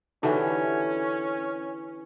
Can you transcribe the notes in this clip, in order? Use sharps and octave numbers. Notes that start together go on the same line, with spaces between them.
D3 E3 C#4 D#4 F#4 G4